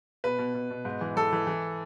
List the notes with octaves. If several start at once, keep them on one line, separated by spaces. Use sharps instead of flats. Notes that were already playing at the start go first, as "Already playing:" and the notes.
B2 B4
B2
B2
B2
G#2
E3
E3 A4
E3
E3